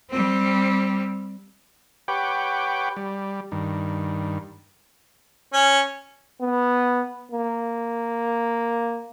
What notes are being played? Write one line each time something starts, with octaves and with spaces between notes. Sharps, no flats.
G3 C4
G4 B4 C#5 F#5 G5 D6
G3
G2 D#3
C#4
B3
A#3